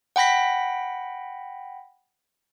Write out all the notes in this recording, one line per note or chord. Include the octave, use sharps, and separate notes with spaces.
F#5 G5 B5 A#6 B6